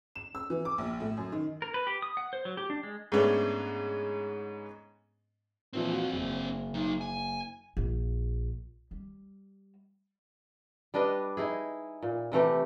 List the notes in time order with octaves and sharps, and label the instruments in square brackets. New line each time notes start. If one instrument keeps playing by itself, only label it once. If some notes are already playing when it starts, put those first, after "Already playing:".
[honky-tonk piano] E7
E6
E3
D6
A#1
A2
F#2
D#3
[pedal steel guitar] A#4
B4
G4
D#6
F#5
C5
F#3
G4
D4
G#3
[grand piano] G#2 G#3 A3 B3 C#4 D4
[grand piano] A#2 E3 F3 [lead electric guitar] C4 D4
[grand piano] F4 F#4
F#1
[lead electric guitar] F#3 D#4
G#5
[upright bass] A#1
G3
[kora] G3 D4 B4 D#5
D#4 E4 G#4
A#2
C3 E3 A3 G4